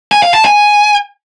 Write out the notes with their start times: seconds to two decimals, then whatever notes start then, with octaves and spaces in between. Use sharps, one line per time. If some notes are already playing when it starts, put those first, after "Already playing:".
0.12 G#5
0.23 F5
0.34 A5
0.45 G#5